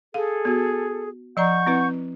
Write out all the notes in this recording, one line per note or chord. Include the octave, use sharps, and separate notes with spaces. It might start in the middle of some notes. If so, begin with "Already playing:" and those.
G#4 A4 F5
B3 F#4
F3 D5 F#5 A#5 C#6 G6
C4 E4 B4